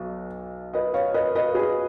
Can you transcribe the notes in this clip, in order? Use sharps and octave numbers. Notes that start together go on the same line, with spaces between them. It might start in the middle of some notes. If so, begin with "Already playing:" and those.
Already playing: B1 B2
B4 D#5
C#5 F5
B4 D#5
B4 D#5
G#4 B4